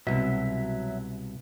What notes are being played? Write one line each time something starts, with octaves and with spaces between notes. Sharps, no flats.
C2 B2 F#3 E5